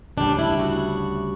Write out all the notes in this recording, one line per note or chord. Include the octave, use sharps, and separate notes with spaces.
D2 C#3 G3 D4
E4
F#4